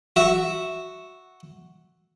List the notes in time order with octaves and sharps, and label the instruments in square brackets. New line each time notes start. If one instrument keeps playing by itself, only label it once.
[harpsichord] F#4 E5